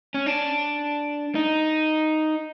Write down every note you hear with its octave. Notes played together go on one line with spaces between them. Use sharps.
C#4
D4
D#4